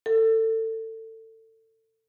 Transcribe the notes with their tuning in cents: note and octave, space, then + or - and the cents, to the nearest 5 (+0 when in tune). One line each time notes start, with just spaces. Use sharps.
A4 +25